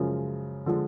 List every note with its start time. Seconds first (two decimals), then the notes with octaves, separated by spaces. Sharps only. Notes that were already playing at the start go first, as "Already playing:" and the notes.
Already playing: F#2 C#3 F3 G#3
0.66 D3 F3 G#3